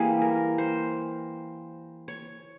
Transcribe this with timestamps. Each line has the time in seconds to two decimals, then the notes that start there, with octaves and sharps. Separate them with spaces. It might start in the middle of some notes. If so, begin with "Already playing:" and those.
Already playing: E3 G3 A#3 G#4
0.22 A#4
0.58 C5
2.08 C#5